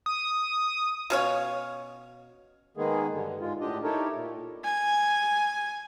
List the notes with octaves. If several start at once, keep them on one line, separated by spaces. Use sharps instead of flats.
D#6
B2 C#4 C#5 F5
D#3 G#3 A#3 B3 G#4
G2 D3
G#2 G#3 F4
A2 D3 D4 G4 D#5
D#4 E4 G4 A4 A#4 C#5
A#2
G#5